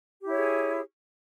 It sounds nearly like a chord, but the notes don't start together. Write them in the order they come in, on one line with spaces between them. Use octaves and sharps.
G4 E4 C#5 G#4